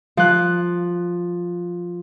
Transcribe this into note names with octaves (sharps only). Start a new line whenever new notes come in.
F3 F#6